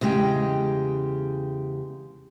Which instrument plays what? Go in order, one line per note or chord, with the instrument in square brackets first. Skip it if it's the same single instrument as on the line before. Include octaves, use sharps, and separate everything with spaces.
[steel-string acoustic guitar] E2 C#3 G#3 G4 G5